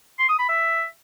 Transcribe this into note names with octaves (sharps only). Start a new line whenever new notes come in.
C6
D#6
B5
E5